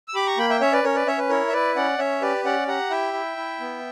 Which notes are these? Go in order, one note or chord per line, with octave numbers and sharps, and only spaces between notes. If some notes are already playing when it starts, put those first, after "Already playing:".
E6
G4 B5 D6
A#5 C#6
A#3 G5 B5
E5 G5
C#4 C#5 E5
B4 D5
C#4 A#4 C#5
B4 D5
C#4 C#5 E5
B4
E4 A#4 C#5
E5
E4 B4 D5
C#4 D5 F#5
C#4 C#5 E5
G4 B4 D5
C#4 D5 F#5
G4 F#5 A#5
E4 E5 G5
E4
E4
B3